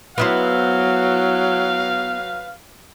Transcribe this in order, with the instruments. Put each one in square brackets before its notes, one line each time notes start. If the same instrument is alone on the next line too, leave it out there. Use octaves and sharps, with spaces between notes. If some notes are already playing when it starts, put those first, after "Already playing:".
[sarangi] F#3 [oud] B3 E4 C5 [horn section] B4 F5